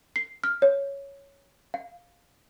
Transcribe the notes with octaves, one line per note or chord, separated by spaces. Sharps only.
C7
F6
C#5
F5